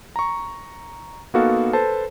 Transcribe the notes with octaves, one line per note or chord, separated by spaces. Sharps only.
A#5 C#6
A#3 B3 D#4 F#4 A4 F5
A4 B4 C5 A5